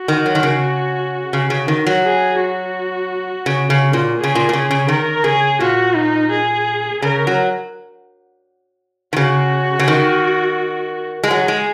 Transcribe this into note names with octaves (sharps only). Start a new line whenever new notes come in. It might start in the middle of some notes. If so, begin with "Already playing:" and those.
Already playing: F#4
D#3
F#3
D#3
C#3
C#3
C#3
D#3
F#3
G#4
F#4
C#3
C#3
A#2
G#4
C#3
A#2
A#2
C#3
C#3
D#3 A#4
C#3 G#4
A#2 F#4
D#4
G#4
C#3 A#4
F#3
D#3
C#3 F#4
C#3
D#3
G#3
F#3 G#4
G#3